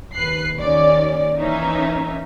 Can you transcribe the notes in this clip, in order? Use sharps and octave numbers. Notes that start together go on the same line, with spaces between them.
D#2 B4 F#6 C7
D#2 D#3 C#4 D5
E3 A#3 C#4 D#4 E5